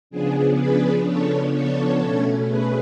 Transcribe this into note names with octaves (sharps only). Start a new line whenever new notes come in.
C#3 F3 B3 D4 G#4
G#4 B4
A4 C#5
A4 C#5
B2 A3 C#4
G#4 B4